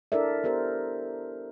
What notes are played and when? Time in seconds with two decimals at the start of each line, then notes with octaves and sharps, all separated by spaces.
0.12 D4 E4 A4 A#4 D5 E5
0.44 B3 G4 A#4 C5